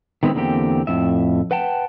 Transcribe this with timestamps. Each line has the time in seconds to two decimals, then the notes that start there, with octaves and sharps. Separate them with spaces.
0.23 D#3 G#3 B3 C4 E4
0.35 E2 D3 A#3 C4 G4
0.87 F2 A2 E5
1.51 B4 F#5 G5 A5